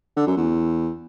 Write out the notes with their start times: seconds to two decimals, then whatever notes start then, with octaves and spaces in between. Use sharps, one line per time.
0.16 D3
0.27 F#2
0.37 E2